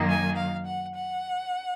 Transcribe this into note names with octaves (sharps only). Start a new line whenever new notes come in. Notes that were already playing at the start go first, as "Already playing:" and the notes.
Already playing: F#2 D#3 F#3 A#3
G#5
F5
F#5
F#5